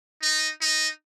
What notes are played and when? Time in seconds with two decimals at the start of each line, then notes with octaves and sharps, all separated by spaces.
0.22 D#4
0.61 D#4